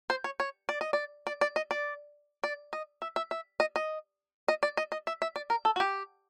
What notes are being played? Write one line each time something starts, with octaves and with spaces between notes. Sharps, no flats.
C5
C#5
C#5
D5
D#5
D5
D5
D5
D#5
D5
D5
D#5
E5
E5
E5
D#5
D#5
D#5
D5
D#5
D#5
E5
E5
D5
A#4
A4
F#4
G4